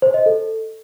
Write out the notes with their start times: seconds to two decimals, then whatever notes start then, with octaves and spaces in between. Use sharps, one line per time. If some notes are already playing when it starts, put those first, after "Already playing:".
0.02 C5
0.14 D#5
0.26 A4